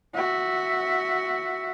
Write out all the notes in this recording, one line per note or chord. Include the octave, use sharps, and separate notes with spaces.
F#4 E5